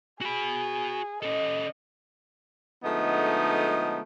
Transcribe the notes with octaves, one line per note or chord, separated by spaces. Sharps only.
F#4 G#4 B5
C#4 A4 D#5
D3 F3 G#3 A3 B3 D#4